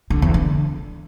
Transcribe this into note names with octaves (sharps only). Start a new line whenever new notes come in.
D3
E2
D3